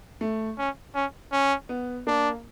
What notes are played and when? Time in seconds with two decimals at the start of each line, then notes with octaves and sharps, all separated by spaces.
0.21 A3
0.58 C#4
0.94 C#4
1.32 C#4
1.69 B3
2.07 A#3 D4